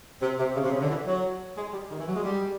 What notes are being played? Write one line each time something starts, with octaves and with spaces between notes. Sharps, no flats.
C3
C3
C#3
C3
C#3
D3
E3
F#3
G#3
G3
D#3
E3
F#3
G#3
G3